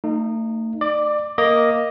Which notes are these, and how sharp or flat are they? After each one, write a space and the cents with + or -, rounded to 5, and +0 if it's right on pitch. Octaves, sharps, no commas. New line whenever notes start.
A3 +35 D#4 -20
D5 +30 D6 +0
A#3 +0 D#5 +0 D6 +0